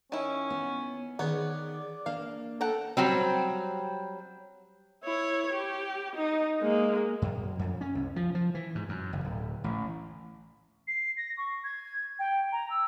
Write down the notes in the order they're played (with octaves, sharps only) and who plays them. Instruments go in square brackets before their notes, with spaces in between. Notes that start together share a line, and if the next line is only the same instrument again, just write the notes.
[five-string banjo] D#3 E4 [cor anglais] C#4
[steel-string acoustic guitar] B3
[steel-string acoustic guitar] D#3 G#4 A#4 [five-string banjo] B3 C#5 [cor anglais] D5
[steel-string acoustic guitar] A#3 D4 [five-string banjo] F5
[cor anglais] A4 [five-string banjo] F#5 G5 A#5
[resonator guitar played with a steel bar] F#3 G3 C4
[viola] E4 C#5
G4
D#4
G#3 A#3
[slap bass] F#2
F2
C#4
C2
F3
F3
E3
G#2
F#2
F#1
D1
A1
[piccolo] C7
A#6
C#6
G#6
G5
A#5
E6